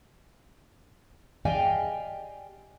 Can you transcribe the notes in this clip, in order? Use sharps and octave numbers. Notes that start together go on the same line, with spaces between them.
G4 D5 D#5 F5 G5 G#5